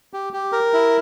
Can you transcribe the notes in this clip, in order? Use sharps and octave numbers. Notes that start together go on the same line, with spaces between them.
G4
G4
A#4
E4